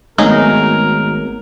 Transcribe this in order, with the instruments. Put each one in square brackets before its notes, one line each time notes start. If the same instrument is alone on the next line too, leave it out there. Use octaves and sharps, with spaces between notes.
[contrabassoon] G#1 [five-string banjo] F#3 D#4 G#4 [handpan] G#3 A3 B3 [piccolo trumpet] A#4